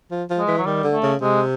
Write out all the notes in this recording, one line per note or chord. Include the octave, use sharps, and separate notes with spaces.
F3
F3
G#3
E3
F#3
D#3 G3
D3
A3
C#3
C3 G#3